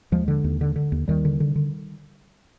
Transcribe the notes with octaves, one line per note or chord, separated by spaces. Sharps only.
D#2 F3 G#3
D3
D#2
D3
D3
D#2
D#2 D#3 G3
D3
D3
D3